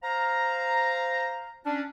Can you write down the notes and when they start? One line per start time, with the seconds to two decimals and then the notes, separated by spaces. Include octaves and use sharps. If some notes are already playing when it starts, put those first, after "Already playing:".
0.03 C5 F5 A#5
1.65 C#4 D4